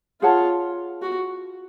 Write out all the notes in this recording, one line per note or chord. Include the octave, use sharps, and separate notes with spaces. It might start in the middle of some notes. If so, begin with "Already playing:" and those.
F4 G#4 C#5 F#5 A5
F#4